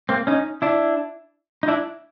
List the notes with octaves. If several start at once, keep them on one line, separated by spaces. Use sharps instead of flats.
A#3 C4
C#4 D#4
D4 E4
D#4
D4 E4